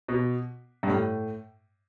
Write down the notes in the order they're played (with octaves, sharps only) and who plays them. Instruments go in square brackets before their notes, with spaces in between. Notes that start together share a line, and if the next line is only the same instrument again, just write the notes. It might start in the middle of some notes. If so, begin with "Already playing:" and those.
[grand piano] B2
G2
A2